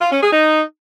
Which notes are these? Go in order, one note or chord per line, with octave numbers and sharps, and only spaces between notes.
F4
C#4
G#4
D#4